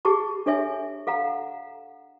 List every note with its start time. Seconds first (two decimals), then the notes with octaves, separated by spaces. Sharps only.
0.05 G4 G#4 A5 C#6
0.46 D4 A4 C#5 E5 G#5
1.07 A4 F5 F#5 A#5